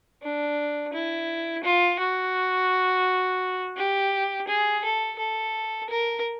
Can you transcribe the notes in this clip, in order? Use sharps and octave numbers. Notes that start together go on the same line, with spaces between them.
D4
E4
F4
F#4
G4
G#4
A4
A4
A#4